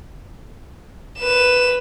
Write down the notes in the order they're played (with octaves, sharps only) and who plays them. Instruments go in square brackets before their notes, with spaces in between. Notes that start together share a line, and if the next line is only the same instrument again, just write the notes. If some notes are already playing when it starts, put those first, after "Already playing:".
[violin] B4 E7